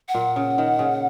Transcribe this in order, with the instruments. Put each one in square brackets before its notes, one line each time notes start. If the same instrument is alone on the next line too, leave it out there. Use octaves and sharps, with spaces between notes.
[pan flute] F#5
[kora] A#2
C#3
D#3
C#3